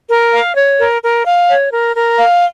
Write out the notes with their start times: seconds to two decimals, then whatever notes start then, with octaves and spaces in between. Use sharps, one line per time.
0.10 A#4
0.33 F5
0.56 C#5
0.79 A#4
1.02 A#4
1.25 F5
1.48 C#5
1.71 A#4
1.95 A#4
2.18 F5